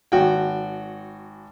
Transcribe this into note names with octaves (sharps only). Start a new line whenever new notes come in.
G#1 F#4 G5